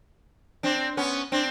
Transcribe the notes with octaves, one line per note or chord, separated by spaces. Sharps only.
C4 D4
B3 C#4
C4 D4